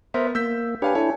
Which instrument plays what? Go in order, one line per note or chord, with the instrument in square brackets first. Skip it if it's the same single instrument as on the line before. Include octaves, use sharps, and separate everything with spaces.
[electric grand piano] B3 A#4 [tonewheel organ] C5 E5
[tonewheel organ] A#3 [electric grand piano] E6 G6 B6
[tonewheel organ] D4 G4 B4 [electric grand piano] C#5 F5 G#5
[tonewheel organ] D4 E4 A4 [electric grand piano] C#5 G#5